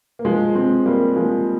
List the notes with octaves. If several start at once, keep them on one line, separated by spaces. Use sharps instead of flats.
A#3
F3 G#3
G#3 C4
G3 A#3
F3 G#3